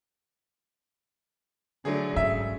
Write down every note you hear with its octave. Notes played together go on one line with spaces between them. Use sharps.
D3 F#3 A3 G#4
G#2 C#3 E5